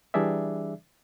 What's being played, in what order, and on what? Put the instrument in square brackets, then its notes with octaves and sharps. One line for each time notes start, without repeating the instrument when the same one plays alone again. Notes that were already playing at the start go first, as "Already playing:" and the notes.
[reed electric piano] E3 G3 D4 G#4 D5 E5